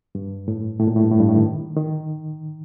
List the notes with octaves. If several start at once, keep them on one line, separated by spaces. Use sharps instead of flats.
G2
A2
A2
A#2
A2
G2
A2
G2
A2
D#3
D#3